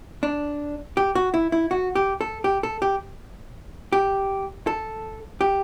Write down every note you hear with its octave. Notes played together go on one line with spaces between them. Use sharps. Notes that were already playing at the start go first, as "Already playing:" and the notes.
D4
G4
F#4
E4
E4
F#4
G4
A4
G4
A4
G4
G4
A4
G4